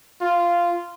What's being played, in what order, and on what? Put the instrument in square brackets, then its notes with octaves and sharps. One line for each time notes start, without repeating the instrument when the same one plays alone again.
[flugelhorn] F4